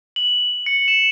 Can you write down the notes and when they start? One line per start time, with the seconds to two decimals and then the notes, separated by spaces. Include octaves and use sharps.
0.16 F#7
0.66 C#7
0.88 E7